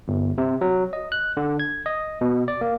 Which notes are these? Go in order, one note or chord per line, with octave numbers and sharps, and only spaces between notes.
G1
C3
F#3
D#5
F#6
D3
G#6
D#5
B2
D5
A#3